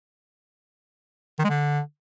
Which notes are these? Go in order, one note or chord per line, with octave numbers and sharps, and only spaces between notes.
D#3
G#3
D3